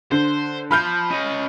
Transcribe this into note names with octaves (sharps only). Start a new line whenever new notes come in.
D3 C5
F3 B5 F6 G6
C#4 D#5